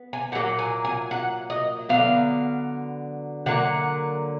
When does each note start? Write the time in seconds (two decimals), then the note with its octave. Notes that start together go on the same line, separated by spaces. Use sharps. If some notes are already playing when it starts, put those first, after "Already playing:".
Already playing: B3
0.13 G#5
0.32 A#2 F#5
0.35 F#3 A#3
0.59 G#5
0.85 G#5
1.11 F#5
1.50 D#5
1.89 D3 F#3 B3 F5
3.46 D3 F#3 A#3 F#5